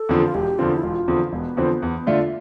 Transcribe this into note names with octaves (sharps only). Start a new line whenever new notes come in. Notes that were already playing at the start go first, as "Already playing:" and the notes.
Already playing: A4
E2 D3 F3 C4
F4
E1 G4
E2 D3 F3 C4 F4
E4
E1 F4
E2 D3 F3 C4
E1 B3
E2 D3 F3 C4
E2
D3 A3 D4 F4